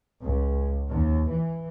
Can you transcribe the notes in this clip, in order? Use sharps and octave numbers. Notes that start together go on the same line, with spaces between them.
C#2
D#2
E3